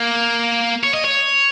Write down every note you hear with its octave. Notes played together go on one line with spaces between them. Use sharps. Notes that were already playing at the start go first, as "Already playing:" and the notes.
Already playing: A#3
C#5
D#5
C#5